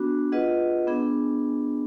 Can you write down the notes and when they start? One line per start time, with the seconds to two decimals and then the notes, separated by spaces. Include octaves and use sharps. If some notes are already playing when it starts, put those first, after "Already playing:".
Already playing: B3 D4 F#4
0.32 F4 G#4 B4 D#5 F#5
0.87 B3 D4 G#4